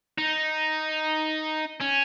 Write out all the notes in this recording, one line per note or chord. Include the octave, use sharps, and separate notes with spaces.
D#4
C#4